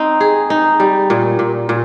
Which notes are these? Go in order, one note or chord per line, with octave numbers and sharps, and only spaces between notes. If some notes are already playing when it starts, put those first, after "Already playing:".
Already playing: C4 D#4
G#4
D#4
G3
A#2
A#2
A#2